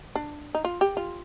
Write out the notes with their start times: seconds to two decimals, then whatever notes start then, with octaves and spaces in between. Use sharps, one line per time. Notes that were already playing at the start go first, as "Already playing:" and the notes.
0.16 D4
0.55 D#4
0.65 F4
0.81 G4
0.97 F4